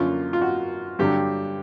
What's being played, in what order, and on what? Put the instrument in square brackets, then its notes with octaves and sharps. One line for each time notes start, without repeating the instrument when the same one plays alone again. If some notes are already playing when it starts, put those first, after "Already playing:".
Already playing: [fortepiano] F#2 D3 F3 A#3 C#4 F4
F4
F#4
G2 D3 F#3 G4